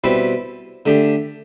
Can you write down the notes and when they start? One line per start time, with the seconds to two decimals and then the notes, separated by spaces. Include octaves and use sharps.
0.04 B2 G3 C4 E4 B4
0.86 D3 A3 D4 G4